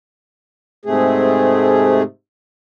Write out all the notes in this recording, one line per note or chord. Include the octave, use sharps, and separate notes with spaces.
G#2 C3 A3 G#4